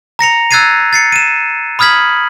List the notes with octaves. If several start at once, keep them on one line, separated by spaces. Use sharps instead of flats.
A#5 A#6 C#7 F7
E6 F#6 G#6 A6 C7 D#7
A6 C7 C#7
D#7 E7
B5 D#6 F6 G#6 B6 F#7